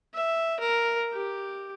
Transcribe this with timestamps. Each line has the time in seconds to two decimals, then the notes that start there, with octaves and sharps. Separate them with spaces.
0.14 E5
0.60 A#4
1.13 G4